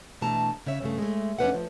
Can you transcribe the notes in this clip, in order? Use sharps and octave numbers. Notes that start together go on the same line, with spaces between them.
B2 E3 A3 D4 A5 A#5
C#3 C#5 E5
G2 C#3 A3
G#3 A3
F2 C#4 D4 B4 C5 F#5
F3